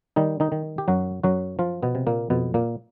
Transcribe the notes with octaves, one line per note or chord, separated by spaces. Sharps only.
D#3 G3 D#4
D#3 D#4
D#3
G4
F#2 F#3 F#4
F#2 F#3 F#4
F3 F4
B2 B3
C3
A#2 A#3
F2 B2 B3
A#2 A#3